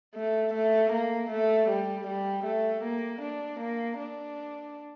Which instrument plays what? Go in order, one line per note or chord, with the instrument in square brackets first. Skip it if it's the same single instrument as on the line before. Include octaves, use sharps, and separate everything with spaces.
[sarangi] A3
A3
A#3
A3
G3
G3
A3
A#3
D4
A#3
D4